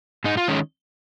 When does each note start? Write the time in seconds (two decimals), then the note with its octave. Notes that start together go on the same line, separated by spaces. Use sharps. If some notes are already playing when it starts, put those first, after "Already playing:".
0.24 G#2 D#4
0.37 F4
0.48 D#3 G#3 C#4